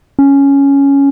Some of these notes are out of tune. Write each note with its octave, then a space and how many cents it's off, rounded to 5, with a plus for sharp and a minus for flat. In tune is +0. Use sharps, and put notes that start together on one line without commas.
C#4 +5